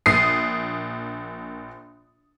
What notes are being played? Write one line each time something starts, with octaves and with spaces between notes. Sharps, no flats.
A#1 D#6 C7